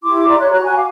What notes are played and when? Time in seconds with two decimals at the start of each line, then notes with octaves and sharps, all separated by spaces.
0.04 E4 G4 C6 D6
0.28 D5 E5 A#5 C6
0.40 C#5 F#6
0.52 F#4 A#5 F#6
0.65 F#4 G#5
0.77 F5 D6